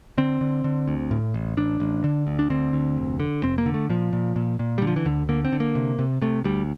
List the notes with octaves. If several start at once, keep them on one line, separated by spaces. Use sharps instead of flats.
D3 C4
D3
D3
D2
A2
A1
A1 D4
A1
D3
D2
D4
D3 C4
D2
F1
D3
F1 C4
A#3
D3
A3
A#2 F3
A#2
A#2
A#2
G3
D3
F3
E3
D2 D3
D3 A#3
C4
D3
A#3
C3
C3
C3 A3
D2 G3